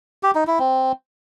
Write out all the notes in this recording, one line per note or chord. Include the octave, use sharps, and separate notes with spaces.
G4
D#4
E4
C4